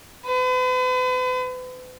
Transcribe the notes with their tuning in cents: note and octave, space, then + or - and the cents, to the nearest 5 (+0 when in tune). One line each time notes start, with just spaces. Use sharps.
B4 +40